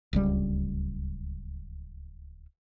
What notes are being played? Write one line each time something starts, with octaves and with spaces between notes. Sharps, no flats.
D1 C#2 G3